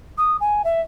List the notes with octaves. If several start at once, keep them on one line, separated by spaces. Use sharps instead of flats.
D#6
G#5
E5